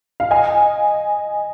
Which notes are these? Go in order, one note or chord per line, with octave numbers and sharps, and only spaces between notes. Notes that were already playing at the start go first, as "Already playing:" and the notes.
F5
D#5 G#5